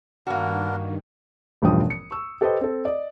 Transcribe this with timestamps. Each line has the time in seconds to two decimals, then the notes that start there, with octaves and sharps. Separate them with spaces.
0.27 G2 D#3 A#3 B3 D4 F#4 A#4
1.62 E1 A1 G2 F3 G5 D#6
1.90 C#7
2.11 C#6 E6
2.41 G4 A4 B4 C5 D#5 G5
2.61 C4 A4
2.85 D5 D#5